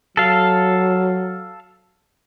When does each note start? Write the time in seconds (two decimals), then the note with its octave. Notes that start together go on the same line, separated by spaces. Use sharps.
0.17 F#3 A4 F5